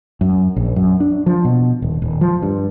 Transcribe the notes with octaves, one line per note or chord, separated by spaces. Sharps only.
F#2
A#1
F#2
D4
F3
B2
D#1
D#1
F3
G2